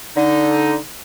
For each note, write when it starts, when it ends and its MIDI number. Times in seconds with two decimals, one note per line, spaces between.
0.17 0.75 50
0.17 0.75 63